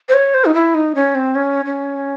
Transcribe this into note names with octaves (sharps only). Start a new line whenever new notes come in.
C5
C#5
C5
D#4
E4
D#4
C#4
C4
C#4
C#4